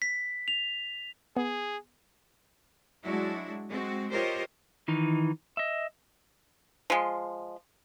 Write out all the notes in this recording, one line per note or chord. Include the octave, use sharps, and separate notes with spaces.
B6
F7
B3 G#4
F#3 G#3 D4 E4 F#4
G#3 C4 F#4
F4 G4 A#4 C5 C#5 D#5
D#3 E3 D#4
D#5 E5
F3 G#3